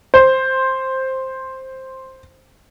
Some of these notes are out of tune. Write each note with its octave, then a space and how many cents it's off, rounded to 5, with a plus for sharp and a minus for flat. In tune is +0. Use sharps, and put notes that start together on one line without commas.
C5 +5